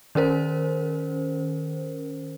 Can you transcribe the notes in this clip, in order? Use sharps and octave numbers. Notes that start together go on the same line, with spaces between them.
D#3 C#4 A#4 C5